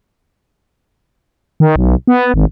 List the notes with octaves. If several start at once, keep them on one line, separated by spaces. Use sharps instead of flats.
D#3
B1
B3
G#1